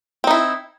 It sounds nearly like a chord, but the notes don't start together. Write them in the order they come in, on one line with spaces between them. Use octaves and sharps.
C4 D#4 E4